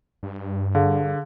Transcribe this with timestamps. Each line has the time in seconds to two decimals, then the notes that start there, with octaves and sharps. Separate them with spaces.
0.23 G2
0.75 D3 G#4 F5